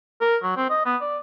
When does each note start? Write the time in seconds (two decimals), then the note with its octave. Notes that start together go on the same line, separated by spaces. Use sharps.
0.21 A#4
0.43 F#3
0.56 C4
0.70 D#5
0.86 B3
1.01 D5